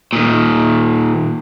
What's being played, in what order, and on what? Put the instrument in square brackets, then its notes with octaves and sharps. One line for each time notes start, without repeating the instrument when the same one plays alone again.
[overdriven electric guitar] A#2 D#3